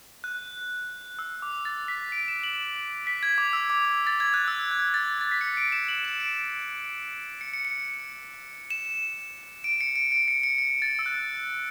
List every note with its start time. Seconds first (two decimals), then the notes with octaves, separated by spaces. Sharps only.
0.24 F#6
1.19 E6
1.42 D6
1.65 A6
1.88 B6
2.12 D7
2.28 E7
2.43 F#7
3.07 B6
3.23 G#6
3.38 D6
3.53 E6
3.70 D6
3.85 D6
4.07 A6
4.20 G#6
4.34 F#6
4.48 E6
4.71 G#6
4.94 A6
5.21 A6
5.31 B6
5.41 C#7
5.57 D7
5.72 E7
5.88 F#7
6.05 E7
6.20 D7
7.41 C#7
7.53 C#7
7.65 C#7
8.70 E7
9.64 D7
9.81 C#7
9.96 D7
10.12 D7
10.28 C#7
10.43 C#7
10.58 C#7
10.82 A6
10.99 E6
11.06 F#6